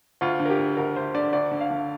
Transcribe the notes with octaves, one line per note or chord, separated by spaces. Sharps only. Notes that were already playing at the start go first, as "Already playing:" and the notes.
D2 F4
D3
A#4
G4
D3
D2 A#4
D2 C5
D3 D5
D2 D5
D3
F5
D3